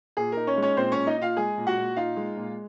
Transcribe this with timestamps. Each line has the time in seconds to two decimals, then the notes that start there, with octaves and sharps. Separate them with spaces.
0.17 A#2 G#4
0.32 D#4 A#4
0.47 C#4 C#5
0.57 G#3
0.62 C#4 C#5
0.77 A#2 C4 C5
0.92 C#4 C#5
0.97 A#2
1.07 D#4 D#5
1.18 D#4 F4 F5
1.37 G#3 G#4 G#5
1.58 A#2
1.67 F#4 F#5
1.77 A#2
1.96 D#4 F4 F5
2.17 G#3
2.36 A#2